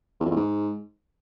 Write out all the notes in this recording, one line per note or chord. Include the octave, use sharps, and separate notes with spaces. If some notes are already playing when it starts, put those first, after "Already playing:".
E2
F2
E2
G#2